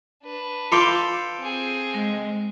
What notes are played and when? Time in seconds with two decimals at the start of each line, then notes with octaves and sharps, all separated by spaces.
0.23 D4 B4
0.72 F4 A4 F5 G5 C6 D6
1.39 C4 G#4
1.93 G#3